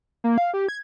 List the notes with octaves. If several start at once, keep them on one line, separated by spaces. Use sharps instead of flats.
A#3
F5
G4
G#6